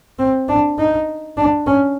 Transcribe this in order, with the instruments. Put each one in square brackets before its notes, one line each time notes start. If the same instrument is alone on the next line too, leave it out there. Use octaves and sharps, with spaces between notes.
[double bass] C4
D4
D#4
D4
C#4